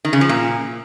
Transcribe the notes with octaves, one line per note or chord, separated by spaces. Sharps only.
D#3
C#3
F3
A#2